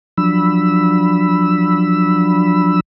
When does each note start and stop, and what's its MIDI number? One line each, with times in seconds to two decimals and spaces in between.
0.18 2.80 53
0.18 2.80 54
0.18 2.80 62
0.18 2.80 83
0.18 2.80 88